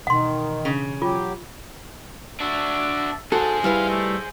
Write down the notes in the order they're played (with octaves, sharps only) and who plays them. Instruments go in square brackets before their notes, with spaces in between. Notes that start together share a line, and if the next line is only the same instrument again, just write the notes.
[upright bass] B2 E3 [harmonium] D#3 [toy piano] F#5 C6
[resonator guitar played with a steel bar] C#3
[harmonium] F#3 G4 [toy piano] F4
[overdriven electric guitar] D4 F#4 [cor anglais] E5
[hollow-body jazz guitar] F#4 A4 [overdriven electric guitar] G#4 C5
[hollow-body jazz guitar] G3 E4 B4 [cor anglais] F5
[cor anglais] A3